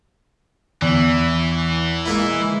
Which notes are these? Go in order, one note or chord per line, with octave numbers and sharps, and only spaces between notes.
E2 E3
G#3 A#3 E4